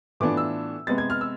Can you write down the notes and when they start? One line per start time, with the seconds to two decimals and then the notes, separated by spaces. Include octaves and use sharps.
0.20 A2 E3 B3 D4 F4 D6
0.37 E6
0.87 C3 G#3 B3 A6
0.98 G#6
1.10 F6
1.21 E6